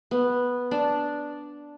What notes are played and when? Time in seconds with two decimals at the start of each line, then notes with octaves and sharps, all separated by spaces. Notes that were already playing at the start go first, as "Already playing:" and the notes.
0.11 B3
0.71 D4